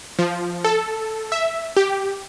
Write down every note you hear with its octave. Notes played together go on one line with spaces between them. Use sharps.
F3
A4
E5
G4